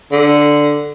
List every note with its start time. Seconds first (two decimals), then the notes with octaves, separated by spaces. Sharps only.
0.12 D3